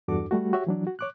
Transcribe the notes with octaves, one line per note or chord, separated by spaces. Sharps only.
E2 G2 D4 F#4 A4 D6
G3 A3 F#4
F#4 G4 C#5 E5
E3 F#3 D4
F#4
C#5 D6 F#6